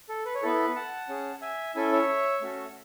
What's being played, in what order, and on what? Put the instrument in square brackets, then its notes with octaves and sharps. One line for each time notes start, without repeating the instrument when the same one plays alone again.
[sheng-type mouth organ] A4
B4
C#5
B3 E4 A4 B4
F#5 A5
C#4 G#4
E5 G#5
C#4 E4 A4 E5 G#5
C#5 E5
A3 C#4 F#4 A4